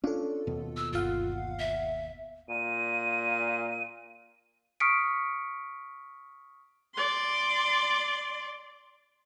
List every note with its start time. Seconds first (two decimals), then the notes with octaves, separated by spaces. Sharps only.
0.04 C#4 D4 F4 A4
0.47 D#2 B2
0.77 E6
0.93 G1 F4 F5 F#5
1.59 E5
2.49 A#2 D#7
4.80 C#6 D#6 F6 B6 C#7 D7
6.95 D5 C6